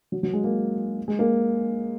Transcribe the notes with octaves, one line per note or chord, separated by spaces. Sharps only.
F#3
F#3
G#3
A#3
G#3
A#3